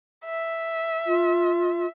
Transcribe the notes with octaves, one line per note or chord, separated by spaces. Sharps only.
E5
F4